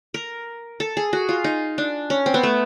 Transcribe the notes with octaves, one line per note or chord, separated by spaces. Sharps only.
A#4
A4
G#4
F#4
F4
D#4
D4
C#4
C4
B3
A3